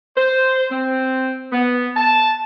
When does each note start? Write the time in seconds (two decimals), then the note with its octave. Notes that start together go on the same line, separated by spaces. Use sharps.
0.17 C5
0.71 C4
1.52 B3
1.96 A5